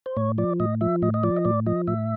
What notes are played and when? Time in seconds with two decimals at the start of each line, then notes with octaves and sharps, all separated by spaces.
0.06 C5
0.17 A2 C#5
0.38 F3 D5
0.60 A2 D#5
0.81 F3 E5
1.02 A2 D#5
1.14 D#5
1.23 F3 D5
1.36 D#5
1.45 A2 D5
1.66 F3 D#5
1.87 A2 E5